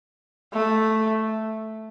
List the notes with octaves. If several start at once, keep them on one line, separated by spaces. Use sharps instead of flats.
A3